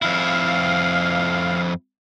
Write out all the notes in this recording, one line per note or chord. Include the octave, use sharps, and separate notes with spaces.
F2 E4 F5